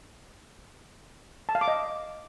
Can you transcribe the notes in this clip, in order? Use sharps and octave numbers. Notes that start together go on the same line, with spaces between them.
A5
F5
D6
D#5